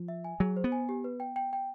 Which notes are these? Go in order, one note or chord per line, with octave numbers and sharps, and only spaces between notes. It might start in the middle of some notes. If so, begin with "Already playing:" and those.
Already playing: F3
E5
G#5
F#3 G#4
C5
B3
G#5
G4
B4
G5
G5
G5